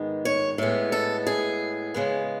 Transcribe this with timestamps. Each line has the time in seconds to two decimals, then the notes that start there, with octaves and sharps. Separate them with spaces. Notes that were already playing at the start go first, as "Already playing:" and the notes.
Already playing: G#2 D#3 G#3 B3
0.25 C#5
0.58 A2 G#3 B3
0.92 A4
1.27 G#4
1.94 C#3 G#3 B3